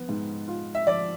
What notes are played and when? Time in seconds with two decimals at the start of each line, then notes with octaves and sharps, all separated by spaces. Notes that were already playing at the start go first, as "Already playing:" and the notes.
Already playing: F3 B3
0.09 G#2
0.48 F4
0.75 E5
0.87 F3 D5